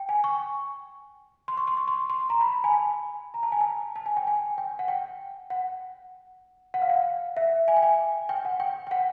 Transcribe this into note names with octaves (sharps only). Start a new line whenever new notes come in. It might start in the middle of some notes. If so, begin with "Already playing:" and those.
Already playing: G5
G#5
C#6
C6
C#6
C6
C#6
C6
C6
A#5
B5
G#5
A5
A#5
A5
G#5
A5
A5
G#5
G5
G#5
G5
F#5
G5
F#5
F#5
F5
F#5
E5
G#5
G5
G#5
G5
F#5
G5
G5
F#5